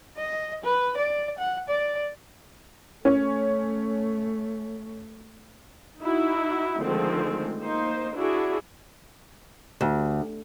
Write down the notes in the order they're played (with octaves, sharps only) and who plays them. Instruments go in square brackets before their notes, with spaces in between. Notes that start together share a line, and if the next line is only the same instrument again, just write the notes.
[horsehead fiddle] D#5
B4
D5
F#5
D5
[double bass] A3 [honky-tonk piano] C#4
[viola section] D#4 E4 F#4
D3 D#3 F3 G#3 A3 C4
A#3 D#4 C5
D4 E4 F#4 G#4
[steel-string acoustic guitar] D2